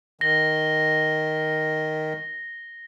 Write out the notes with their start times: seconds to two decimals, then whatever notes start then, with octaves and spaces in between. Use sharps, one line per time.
0.21 D#3 A#6 G7